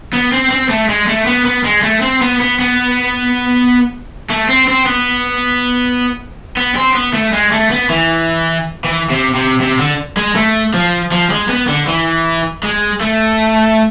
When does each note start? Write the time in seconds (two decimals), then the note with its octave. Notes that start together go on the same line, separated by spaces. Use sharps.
0.13 B3
0.32 C4
0.51 C4
0.70 A3
0.89 G#3
1.07 A3
1.26 B3
1.45 B3
1.65 G#3
1.83 A3
2.02 C4
2.21 B3
2.40 B3
2.60 B3
4.30 A3
4.49 C4
4.68 C4
4.86 B3
6.57 B3
6.76 C4
6.95 B3
7.14 A3
7.33 G#3
7.52 A3
7.71 B3
7.90 E3
8.84 E3
9.10 C3
9.35 C3
9.60 C3
9.79 D3
10.17 G#3
10.36 A3
10.74 F3
11.12 F3
11.31 G#3
11.49 B3
11.68 D3
11.87 E3
12.63 G#3
13.01 A3